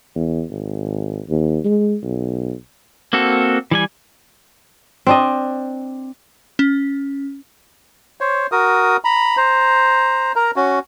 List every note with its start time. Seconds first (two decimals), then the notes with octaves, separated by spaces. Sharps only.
0.15 E2
0.50 G#1
1.29 D#2
1.65 G#3
2.03 B1
3.13 A#3 C4 F#4 A4
3.71 E3 G3 G#5
5.07 C4 D4 D#5
6.59 C#4
8.21 C5 C#5
8.52 F#4 A#4 D#6
9.05 A#5 B5
9.37 C5 A#5
10.36 A#4 A#5
10.56 C#4 F#4